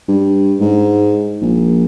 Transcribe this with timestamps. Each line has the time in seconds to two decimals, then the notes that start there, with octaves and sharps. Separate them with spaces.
0.08 G2
0.60 G#2
1.41 A#1